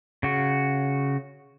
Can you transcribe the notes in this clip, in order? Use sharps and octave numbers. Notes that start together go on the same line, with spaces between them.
C#3 F#4